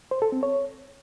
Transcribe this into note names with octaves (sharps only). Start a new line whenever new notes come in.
C5
A4
C4
C#5